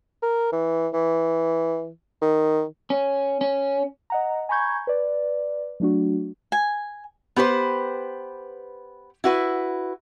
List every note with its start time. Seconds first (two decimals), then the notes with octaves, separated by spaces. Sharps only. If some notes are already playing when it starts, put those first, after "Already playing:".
0.22 A#4
0.52 E3
0.93 E3
2.22 D#3
2.90 C#4
3.41 C#4
4.10 D#5 F#5 A#5
4.49 G#5 A#5 B5 C#6 G6 G#6
4.87 B4 D5
5.80 F#3 A3 D4 F#4
6.52 G#5
7.36 B3 G4 B4 C5
9.24 E4 F#4 B4